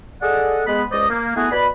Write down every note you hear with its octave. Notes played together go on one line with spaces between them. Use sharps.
G#4 A4 D5 D#5 F#5
G#3 B3 B5
C#2 G#3 C5 D5 D#5
A#3
A3 B3 E4 F#4 G#4
B2 B4 D5 B5